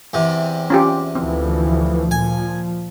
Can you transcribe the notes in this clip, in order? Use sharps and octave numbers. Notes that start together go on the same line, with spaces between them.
E2 C3
C#4 F4 G4
D2 E3 F3 C4
A#2 F3 G#5